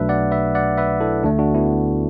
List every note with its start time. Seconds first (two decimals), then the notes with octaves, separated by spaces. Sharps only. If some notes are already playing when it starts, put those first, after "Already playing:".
Already playing: B1 B2 F#3 A3 D4 B4 E5
0.09 D5 F#5
0.32 B4 E5
0.55 D5 F#5
0.77 B4 E5
1.00 E4 A4
1.24 D2 D3 A3 D4
1.39 D4 F#4
1.55 B3 E4